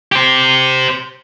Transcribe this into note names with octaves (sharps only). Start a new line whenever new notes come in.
G4 C5